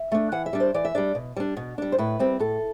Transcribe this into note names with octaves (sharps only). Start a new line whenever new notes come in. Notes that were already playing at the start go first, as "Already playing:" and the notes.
Already playing: E5
A3 D4
E3 F#5
E5
G3 D4
C5
E3 D5
E5
G3 D4 D5
B2
G3 D4
B2
G3 D4
C5
A2 B4
G3 C4
A2 A4